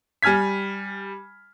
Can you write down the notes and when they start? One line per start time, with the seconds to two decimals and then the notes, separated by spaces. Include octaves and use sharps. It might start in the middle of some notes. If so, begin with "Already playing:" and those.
0.22 G3 G#5 F6 G#6 B6